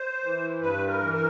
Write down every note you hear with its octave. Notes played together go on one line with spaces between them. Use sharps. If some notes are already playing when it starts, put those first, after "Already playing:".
Already playing: C5
E3
G2 B4
A#4
E3
A#4